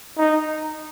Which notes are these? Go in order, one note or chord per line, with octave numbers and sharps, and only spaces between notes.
D#4